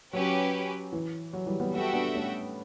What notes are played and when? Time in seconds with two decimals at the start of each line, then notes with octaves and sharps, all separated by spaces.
0.12 F#3 C#4 G4 B4
0.93 E3
1.33 F#3
1.46 E3 G3
1.60 G3 B3
1.73 G3 B3 F#4 A4 E5 G5
1.93 B3 D4
2.14 A3 C#4